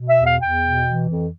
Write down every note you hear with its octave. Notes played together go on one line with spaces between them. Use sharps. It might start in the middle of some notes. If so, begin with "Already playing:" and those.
Already playing: B2
E5
E2
F5
E2 G5
B2
E3
F2